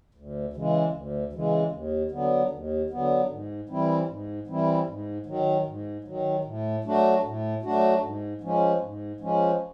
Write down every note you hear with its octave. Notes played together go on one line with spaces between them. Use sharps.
D2
C#3 E3 G#3
D2
C#3 E3 G#3
D#2
D3 F#3 B3
D#2
D3 F#3 B3
G#2
E3 G3 C4 E4
G#2
E3 G3 C4 E4
G#2
D#3 F#3
G#2
D#3 F#3
A2
F#3 A3 D4 F#4
A2
F#3 A3 D4 F#4
G#2
F3 G#3 C#4
G#2
F3 G#3 C#4